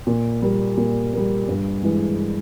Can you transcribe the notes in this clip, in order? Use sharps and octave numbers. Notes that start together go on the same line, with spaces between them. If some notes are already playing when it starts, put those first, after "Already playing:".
A#2
G3 A#3
A#2
G3 A#3
G2
E3 G#3